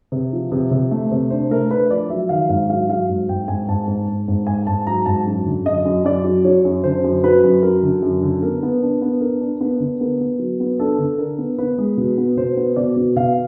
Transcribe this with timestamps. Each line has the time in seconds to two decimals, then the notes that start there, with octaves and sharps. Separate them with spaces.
0.12 C3
0.33 F3
0.52 C3
0.71 C3
0.91 A3
1.12 C3
1.30 D4 C5
1.50 A3 A#4
1.71 D4 B4
1.90 F3 D5
2.10 F#3 E5
2.29 D#3 F5
2.49 G#2 F5
2.69 F#3 F5
2.89 F#3 F5
3.09 G#2
3.29 G#2 G5
3.48 G#2 G#5
3.68 G#2 A5
3.88 G#2
4.08 G#2
4.28 G#2
4.47 G#2 G#5
4.67 G#2 A5
4.87 F#3 A#5
5.06 G#2 A5
5.26 F#2
5.46 D3
5.65 F#2 D#5
5.85 F#2
6.05 F#2 D5
6.24 F#3
6.45 F#3 C#5
6.65 F#2
6.84 D3 C5
7.04 F#2
7.24 F#3 B4
7.44 F#2
7.63 F#3 A#4
7.83 D3
8.02 F#2
8.23 D3
8.43 B3 A#4
8.63 B3
8.82 D4
9.02 B3
9.21 D4 A#4
9.41 D4
9.61 B3 B4
9.80 D3
10.00 B3 A#4
10.20 B3
10.39 F#3
10.60 B3
10.79 D4 A4
10.99 D3
11.18 D4 A#4
11.38 B3
11.59 B3 B4
11.78 G#3
11.97 B2
12.17 B3
12.37 B2 C5
12.57 B3
12.76 B2 D5
12.96 B2
13.16 B2 F5